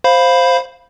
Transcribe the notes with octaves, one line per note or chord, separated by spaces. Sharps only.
C5 F5 B5